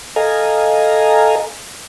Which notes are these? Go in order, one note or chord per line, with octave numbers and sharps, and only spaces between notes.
A4 D#5 F5 G#5 A#5